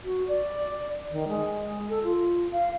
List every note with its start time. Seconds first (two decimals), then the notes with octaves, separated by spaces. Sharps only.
0.04 F#4
0.28 D5
1.11 D#3
1.28 G#3
1.90 A4
2.04 F4
2.52 F5